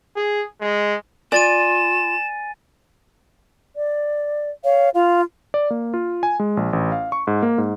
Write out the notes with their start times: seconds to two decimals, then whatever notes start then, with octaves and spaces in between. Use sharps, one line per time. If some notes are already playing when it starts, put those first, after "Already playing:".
0.16 G#4
0.60 G#3
1.32 F4 D5 G#5 A6 D#7 E7
3.76 D5
4.64 C#5 F5
4.94 F4 F5
5.54 D5
5.70 A#3
5.94 F4
6.23 G#5
6.40 G#3
6.57 A#1
6.73 A1
6.92 F5
7.12 C#6
7.27 G#2
7.43 A#3
7.58 G#2